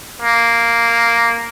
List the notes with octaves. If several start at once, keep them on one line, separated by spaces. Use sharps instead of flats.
A#3